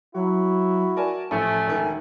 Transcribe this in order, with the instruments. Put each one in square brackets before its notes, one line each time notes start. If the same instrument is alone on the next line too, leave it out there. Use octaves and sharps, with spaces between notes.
[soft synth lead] F#3 [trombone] E4 [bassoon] F#4
[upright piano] A#4 D5 G#5 [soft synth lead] A5
[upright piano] A1 F3 C#7 [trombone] A3 [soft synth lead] G#5
[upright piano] E1 D#3